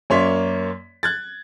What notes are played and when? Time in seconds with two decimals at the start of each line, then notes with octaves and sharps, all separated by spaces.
0.10 F#2 A#3 C#5 D5 C6 B6
1.03 F#6 G#6 A6